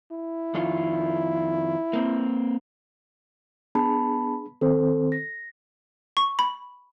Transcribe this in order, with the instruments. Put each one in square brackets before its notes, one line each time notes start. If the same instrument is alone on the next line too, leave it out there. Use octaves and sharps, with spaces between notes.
[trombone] E4
[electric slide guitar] F2 D#3 F4
A#3 C4
[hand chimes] B3 A5 B5 [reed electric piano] D4 G#4
[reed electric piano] D#3 C4 C5 [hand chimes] A4
[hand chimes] A#6
[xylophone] C#6
B5